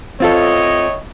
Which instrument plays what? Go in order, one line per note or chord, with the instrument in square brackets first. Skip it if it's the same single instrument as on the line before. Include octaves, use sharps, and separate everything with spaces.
[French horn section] A2 C#5 D#5 [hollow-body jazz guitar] C4 F4 A4